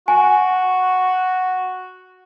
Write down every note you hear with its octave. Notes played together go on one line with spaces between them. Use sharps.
F#4 G#5